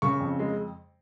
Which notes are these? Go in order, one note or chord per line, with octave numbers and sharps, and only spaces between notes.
C#3 C#6
F2
G#3